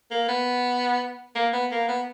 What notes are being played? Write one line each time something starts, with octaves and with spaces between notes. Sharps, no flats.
A#3
B3
A#3
B3
A#3
B3